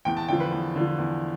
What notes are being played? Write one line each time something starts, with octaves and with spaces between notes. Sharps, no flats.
E2 G5
A5
D3 F3 G5
B4
E2
D3 F3
E2